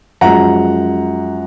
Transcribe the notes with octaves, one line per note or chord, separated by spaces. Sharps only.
F#2 F3 G#3 F#5 A#5